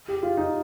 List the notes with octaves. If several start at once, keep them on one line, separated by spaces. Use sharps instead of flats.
G4
F4
D#4